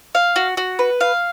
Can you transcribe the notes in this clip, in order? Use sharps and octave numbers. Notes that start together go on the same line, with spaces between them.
F5
F#4
F#4
B4
F5